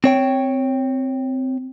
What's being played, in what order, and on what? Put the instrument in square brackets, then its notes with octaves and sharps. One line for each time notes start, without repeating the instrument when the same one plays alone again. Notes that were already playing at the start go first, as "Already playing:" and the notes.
[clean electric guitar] C4 C#5 G5